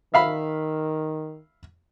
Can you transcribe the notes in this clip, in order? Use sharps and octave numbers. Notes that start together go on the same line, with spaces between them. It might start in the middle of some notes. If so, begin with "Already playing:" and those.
D#3 E5 F5 B5